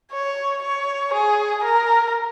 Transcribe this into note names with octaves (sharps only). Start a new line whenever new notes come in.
C#5
C#5
G#4
A#4